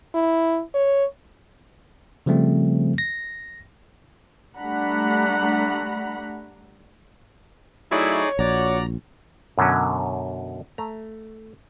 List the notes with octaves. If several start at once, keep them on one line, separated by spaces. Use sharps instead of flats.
E4
C#5
C#3 F3 G3 A3 C4
A#6
G3 A3 D4 F#5 A#5 B5
F#3 A3 D#4 E4 G#4 C#5 D5
A#1 F#4 D5 A#5
F#2 B2 D3 F#3 C#4
A3 A#5